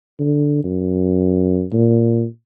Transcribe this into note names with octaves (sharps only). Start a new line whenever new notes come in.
D3
F#2
A#2